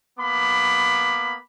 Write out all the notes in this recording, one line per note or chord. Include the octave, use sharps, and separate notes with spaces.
A#3 B3 B5 D6